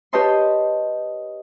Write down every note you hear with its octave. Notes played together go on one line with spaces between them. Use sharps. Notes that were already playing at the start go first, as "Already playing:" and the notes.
G4 B4 C#5 D#5 A5 C6